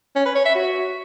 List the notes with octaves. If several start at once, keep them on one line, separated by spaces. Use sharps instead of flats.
C#4
B4
C#5
E5
F#4